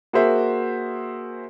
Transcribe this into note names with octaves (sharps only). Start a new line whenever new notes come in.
A#3 F#4 G#4 A#4 C5 E5